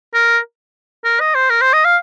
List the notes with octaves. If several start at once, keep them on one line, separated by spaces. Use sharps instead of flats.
A#4
A#4
D#5
C5
A#4
C5
D#5
F5